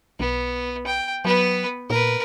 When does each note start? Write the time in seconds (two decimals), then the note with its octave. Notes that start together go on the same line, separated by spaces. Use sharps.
0.20 B1 B3
0.87 G5
1.25 F#3 B3 B4
1.90 A#2 A#4 B4